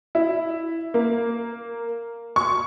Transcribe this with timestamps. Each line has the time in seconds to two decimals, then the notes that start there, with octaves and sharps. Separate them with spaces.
0.15 E4
0.94 A#3
2.36 C#6